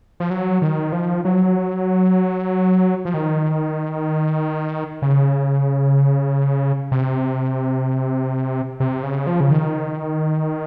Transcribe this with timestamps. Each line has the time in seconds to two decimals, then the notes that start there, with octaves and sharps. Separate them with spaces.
0.20 F3
0.30 F#3
0.62 D#3
0.92 F3
1.25 F#3
3.05 F3
3.14 D#3
5.02 C#3
6.92 C3
8.80 C3
9.03 C#3
9.27 F3
9.40 C#3
9.51 D#3